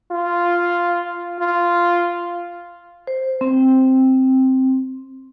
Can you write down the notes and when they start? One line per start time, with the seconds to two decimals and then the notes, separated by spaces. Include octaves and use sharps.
0.12 F4
1.40 F4
3.07 C5
3.41 C4